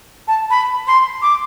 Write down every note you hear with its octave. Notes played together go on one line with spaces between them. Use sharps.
A5
B5
C6
D6